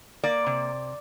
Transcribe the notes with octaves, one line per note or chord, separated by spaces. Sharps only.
A#3 D5
C3